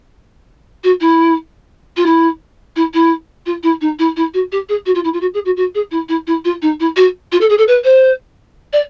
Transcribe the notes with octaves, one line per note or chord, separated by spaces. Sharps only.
F#4
E4
F4
E4
E4
E4
F4
E4
D#4
E4
E4
F#4
G4
G#4
F#4
F4
E4
F4
F#4
G#4
F#4
F#4
G#4
E4
E4
E4
F4
D#4
E4
F#4
F4
A4
G#4
A4
B4
C5
D5